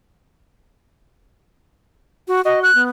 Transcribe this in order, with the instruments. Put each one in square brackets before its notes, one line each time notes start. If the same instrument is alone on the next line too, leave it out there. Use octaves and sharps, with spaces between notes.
[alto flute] F#4
[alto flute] F#4 [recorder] D#5
[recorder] F#6
[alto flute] B3